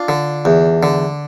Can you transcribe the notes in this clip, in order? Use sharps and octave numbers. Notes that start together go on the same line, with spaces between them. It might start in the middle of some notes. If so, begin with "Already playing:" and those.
Already playing: D4 F4
D3
E2
D3